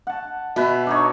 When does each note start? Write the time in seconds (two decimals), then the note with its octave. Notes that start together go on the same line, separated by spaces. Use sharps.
0.07 F#5 A5
0.56 B2 B4 E5
0.87 D4 D#4 C#5